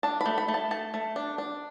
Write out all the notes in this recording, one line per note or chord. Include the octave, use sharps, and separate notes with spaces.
D4 A5
A3 B5
B5
A3
A5
A3 A5
A3
D4
D4